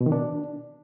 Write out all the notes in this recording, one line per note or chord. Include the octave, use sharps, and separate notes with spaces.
B2
D#3
D4